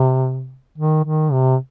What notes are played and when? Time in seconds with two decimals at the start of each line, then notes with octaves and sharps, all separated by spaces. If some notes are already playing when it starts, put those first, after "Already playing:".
Already playing: C3
0.78 D#3
1.05 D#3
1.32 C3